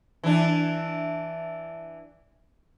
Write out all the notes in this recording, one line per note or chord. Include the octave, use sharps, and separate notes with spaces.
E3 D4